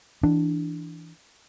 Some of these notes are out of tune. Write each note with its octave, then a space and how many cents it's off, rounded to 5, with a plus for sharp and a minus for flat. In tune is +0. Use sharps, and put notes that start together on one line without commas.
E3 +0 D4 +0